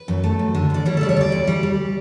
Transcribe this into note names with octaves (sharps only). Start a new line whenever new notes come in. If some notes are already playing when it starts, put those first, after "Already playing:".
Already playing: B4
F#2
A3
F#2
D3
F#2 D5
G3 C#5
A4
C#3 D5
C#5
D2 D5
D2
G3
G3